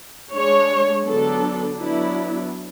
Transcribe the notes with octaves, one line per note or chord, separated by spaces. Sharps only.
G#3 D4 C#5
D3 F#3 B3 D4 A4
F#3 B3 D4 E4